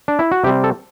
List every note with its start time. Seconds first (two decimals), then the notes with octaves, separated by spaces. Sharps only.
0.08 D4
0.19 E4
0.32 F#4
0.44 C3 G3 C4 G4
0.64 A4